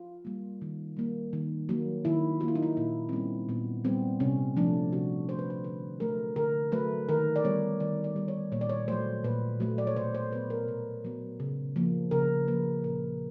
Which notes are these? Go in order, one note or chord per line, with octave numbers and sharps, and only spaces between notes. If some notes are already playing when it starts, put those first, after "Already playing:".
Already playing: F4
G3 A#3
D#3
G3 A#3
D#3
F#3 A#3
D#3 E4
F#3 A#3 E4 F4
D#4
E4
A#2 E4
C4
G3 B3 C#4
A#2 B3
G3 B3 C4
C3 C#4
F3 A3 D4
C3 F#4
F3 A3 C5
B4
C5
D3 B4
F#3 A3 A#4
D3 A#4
F#3 A3 B4
D#3 A#4
D5
G3 B3 C#5
D#3 D5
D5
G3 B3
C#5
A#2 C#5
D5
C#5
F#3 A3 C5
A#2 B4
F#3 A3
D5
C#5
B2 C5
C5
F#3 B3 B4
A#4
B2
F#3 B3
C#3
F3 A#3
C#3 A#4
F3 A#3 B4
A#2 A#4